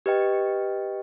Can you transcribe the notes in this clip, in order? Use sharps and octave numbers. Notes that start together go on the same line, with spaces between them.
G4 B4 D#5 G5